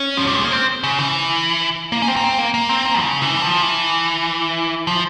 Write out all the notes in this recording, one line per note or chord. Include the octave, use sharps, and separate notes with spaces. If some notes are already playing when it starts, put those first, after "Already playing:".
Already playing: C#4
F3
G3
G#3
A#3
C4
C#3
E3
A#3
C#4
C4
A#3
C4
A#3
A#3
C4
A#3
C#3
E3
G3
F3
E3
F3